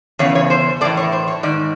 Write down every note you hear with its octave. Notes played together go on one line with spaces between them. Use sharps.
E2 C#3 C#5
C#5
C5
A2 E3 D5
C#5
C5
C#5
G#2 D#3 D5